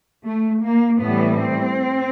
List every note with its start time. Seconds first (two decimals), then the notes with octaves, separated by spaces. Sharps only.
0.25 A3
0.63 A#3
1.01 A2 E3 G3 B3
1.39 C4